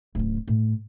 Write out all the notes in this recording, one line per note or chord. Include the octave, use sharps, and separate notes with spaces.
D1 C#3
A2